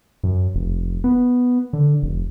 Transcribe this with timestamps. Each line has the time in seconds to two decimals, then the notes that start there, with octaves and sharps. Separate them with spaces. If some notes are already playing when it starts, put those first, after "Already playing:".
0.24 F#2
0.55 F1
1.04 B3
1.73 D3
2.02 F1